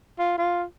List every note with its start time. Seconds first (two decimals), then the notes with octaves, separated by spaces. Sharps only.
0.19 F4
0.38 F4